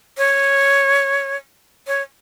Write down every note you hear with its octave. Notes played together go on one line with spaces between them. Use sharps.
C#5
C#5